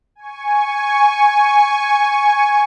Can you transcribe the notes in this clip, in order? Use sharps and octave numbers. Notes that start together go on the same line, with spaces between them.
G#5 C#6